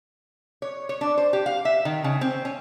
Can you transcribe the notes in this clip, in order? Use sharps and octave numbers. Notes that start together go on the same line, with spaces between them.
C#5
C#5
D4
C5
G4
F5
E5
D#3
C#3
C4
C#4